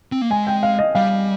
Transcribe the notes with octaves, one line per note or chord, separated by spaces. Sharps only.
C4
A#3
G#3 G#5
G5
F5
D#5
G3 F5